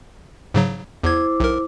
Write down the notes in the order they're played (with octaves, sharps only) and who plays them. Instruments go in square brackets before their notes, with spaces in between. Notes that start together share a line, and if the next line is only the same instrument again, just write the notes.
[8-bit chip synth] G#2 C#3 F#3
[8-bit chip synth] E2 G#6 [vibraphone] E4 C5 D6
[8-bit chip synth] B1 A#4